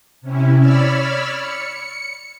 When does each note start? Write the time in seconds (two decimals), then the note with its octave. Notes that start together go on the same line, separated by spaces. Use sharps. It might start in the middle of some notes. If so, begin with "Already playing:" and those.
0.21 C3 C#4 E4
0.59 C#5 D5 B5 E6 F6
1.35 C#7